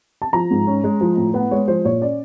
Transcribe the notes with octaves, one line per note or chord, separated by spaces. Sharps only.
A5
F3 A#5
G#2
C#4
G#3
F3
A2
B3 F#5
G#3 C#5
F3 C5
A#2 C#5
C#4 D5